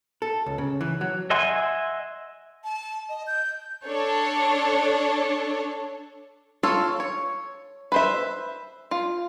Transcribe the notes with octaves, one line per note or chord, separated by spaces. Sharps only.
A4
C#2
C#3
E3
F#3
D#5 E5 F#5 G#5 C6
A5
D#5
G6
D4 A4 C#5
F4 A4 C#5 F5
C#5
B4 C5 E5
F4